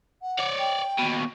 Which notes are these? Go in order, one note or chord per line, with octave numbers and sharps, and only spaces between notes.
F#5
C#5 D5
G5
D#2 B2